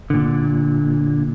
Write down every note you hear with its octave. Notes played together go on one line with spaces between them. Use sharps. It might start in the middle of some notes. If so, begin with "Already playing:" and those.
A#2 D3